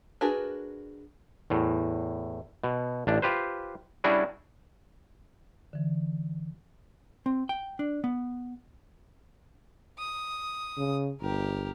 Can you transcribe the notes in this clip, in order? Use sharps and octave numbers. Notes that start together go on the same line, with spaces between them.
D4 F#4 G#4 A#4 B4
E2 A2
B2
A1 D4
F4 G4 B4 C5
G3 C#4 D4 E4 F#4 G#4
D3 E3
C4
G5
D4
B3
D#6
C#3
G1 G4 A#4